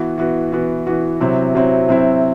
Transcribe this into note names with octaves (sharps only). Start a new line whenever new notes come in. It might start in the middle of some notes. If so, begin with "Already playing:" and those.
Already playing: E3 B3 F#4
E3 B3 F#4
E3 B3 F#4
E3 B3 F#4
C3 F#3 C4 E4
C3 F#3 C4 E4
C3 F#3 C4 E4